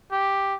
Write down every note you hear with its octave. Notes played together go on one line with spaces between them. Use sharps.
G4